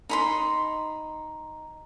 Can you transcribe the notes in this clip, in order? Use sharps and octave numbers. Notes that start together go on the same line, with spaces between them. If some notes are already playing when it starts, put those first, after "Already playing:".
D#4 B5 C6